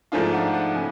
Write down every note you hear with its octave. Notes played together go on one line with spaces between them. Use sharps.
G#2 F3 A3 D4 F4 G#5
F#5
F#5
C#3 G#5